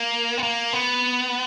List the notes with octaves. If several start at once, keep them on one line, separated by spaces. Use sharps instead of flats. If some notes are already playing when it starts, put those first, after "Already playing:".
Already playing: A#3
B3
A#3
B3